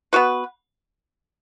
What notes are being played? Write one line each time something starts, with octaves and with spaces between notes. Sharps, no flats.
B3 F#4 B4